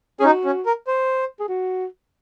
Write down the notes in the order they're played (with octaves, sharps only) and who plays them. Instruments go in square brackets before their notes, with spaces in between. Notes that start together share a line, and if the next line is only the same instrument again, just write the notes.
[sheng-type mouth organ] C#4 [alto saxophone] G#4
[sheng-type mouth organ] D#4 [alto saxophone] F#4
[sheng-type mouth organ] C#4
A#4
C5
[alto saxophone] G#4
F#4